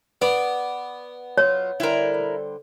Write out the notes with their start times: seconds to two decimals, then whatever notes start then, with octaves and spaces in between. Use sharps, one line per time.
0.22 B3 D5
1.37 F#3 D#4 F4 C#5
1.80 D3 G3 E4 A#4 C5